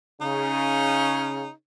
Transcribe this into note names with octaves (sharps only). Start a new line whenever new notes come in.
C#3 D#4